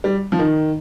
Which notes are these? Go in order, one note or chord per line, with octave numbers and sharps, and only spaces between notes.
G3
F3
D#3